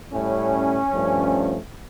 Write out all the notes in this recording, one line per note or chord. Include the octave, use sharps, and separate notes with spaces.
A2 G3 C#4
G2 F3 A3